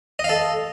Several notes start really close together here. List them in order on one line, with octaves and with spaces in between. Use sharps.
D#5 F5 A4